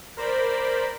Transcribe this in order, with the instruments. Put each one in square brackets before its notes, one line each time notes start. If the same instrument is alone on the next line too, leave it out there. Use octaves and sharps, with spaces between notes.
[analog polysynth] A#4 C5 D5 B5